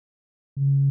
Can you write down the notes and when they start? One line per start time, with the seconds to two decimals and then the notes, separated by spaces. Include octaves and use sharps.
0.57 C#3